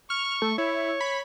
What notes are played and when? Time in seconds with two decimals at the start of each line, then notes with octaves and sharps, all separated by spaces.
0.10 C#6 F6
0.42 A3
0.58 E4 C#5
1.01 B5